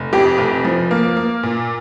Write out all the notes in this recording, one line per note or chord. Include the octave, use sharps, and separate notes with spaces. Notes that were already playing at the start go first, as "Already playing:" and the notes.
Already playing: F1
F2 G4
F1
F3
A#3
A#3
A#2